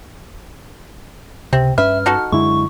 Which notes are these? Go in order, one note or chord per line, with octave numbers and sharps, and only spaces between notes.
C#2 C3 C4
G2 C#4 B4 E5 F6
D#4 F#4 A4
F#2 D3 G#3 D4 E4 C#6